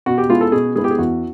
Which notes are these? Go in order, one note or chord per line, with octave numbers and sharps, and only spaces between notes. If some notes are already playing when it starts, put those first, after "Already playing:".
B2 F#4
G4
G#3 B3 E4 F4
A4
B2 G#4
G#3 B3 E4 G#4
G4
G#4
E2 F#4